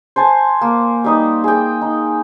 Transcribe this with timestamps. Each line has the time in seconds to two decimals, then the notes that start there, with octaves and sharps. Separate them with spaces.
0.16 C5 G#5 A5
0.61 A#3
1.04 G3 D#4 D#6
1.44 G#4 G5
1.81 D#4